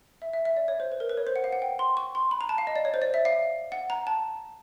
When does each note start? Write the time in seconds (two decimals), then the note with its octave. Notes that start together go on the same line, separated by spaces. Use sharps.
0.22 E5
0.33 E5
0.45 E5
0.57 D5
0.68 C#5
0.80 C5
0.92 B4
1.00 A#4
1.09 B4
1.17 C#5
1.27 C5
1.36 F#5
1.44 F5
1.52 F#5
1.62 G5
1.79 C6
1.97 C#6
2.15 C6
2.31 B5
2.41 A#5
2.49 A5
2.58 F5
2.67 D#5
2.76 D5
2.85 C#5
2.94 C5
3.02 D5
3.14 E5
3.25 F5
3.72 F#5
3.90 A#5
4.07 A5